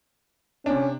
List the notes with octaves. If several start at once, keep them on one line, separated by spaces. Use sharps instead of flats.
C3 C#4 D4